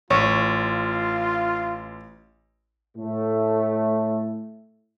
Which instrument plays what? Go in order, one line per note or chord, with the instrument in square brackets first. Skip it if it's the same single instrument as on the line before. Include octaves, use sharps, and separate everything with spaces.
[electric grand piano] A1 [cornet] F4 [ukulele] C#5
[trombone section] A2 A3